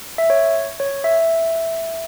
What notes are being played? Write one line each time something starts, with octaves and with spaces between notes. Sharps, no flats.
E5
C#5
C#5
E5